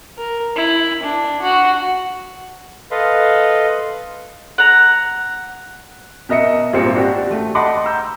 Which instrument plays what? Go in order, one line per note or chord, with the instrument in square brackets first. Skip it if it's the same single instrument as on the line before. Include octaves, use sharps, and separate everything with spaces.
[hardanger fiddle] A#4
E4
D4
F#4
[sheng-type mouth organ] A4 B4 D#5 F5 B5 C6
[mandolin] F#5 A#5
[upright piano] B2 A#4 D#5 E5 C#7
G#1 A#2 G3 A#3 C4 C#7
D4 F#4 G4
A3
D#5 F#5 A5 B5 C6 D6
A#5 E6 G6